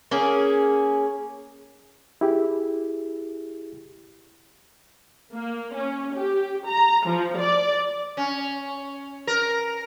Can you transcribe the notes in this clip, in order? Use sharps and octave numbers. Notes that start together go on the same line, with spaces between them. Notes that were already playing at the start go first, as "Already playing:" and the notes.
A#3 C#4 G#4
E4 G4 G#4
A#3
C#4
G4
A#5
F3
D5
C#4
A#4